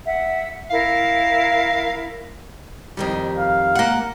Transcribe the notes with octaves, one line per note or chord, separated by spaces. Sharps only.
E5 F#5
E4 A#4 F5
F2 D#3 G3
F5
A#3 F#5